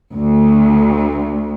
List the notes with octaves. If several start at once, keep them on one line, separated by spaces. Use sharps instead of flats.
D2